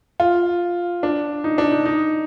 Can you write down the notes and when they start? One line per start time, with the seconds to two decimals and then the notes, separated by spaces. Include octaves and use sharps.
0.20 F4
1.03 D4
1.44 D#4
1.58 D4
1.72 D#4
1.86 D#4